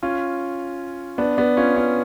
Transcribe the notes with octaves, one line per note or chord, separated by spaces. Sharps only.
C#4 F4
B3 D4
B3 D4
C#4 F4
C#4 F4